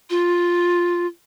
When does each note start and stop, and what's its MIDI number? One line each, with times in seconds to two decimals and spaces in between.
0.10 1.06 65